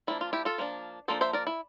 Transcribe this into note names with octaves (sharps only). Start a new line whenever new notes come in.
F3 A#3 D4 E4
F4
E4 G4
F4 A4
F3 A#3 D4
F3 A#3 D4 A4 C5
C5 E5
A#4 D5
E4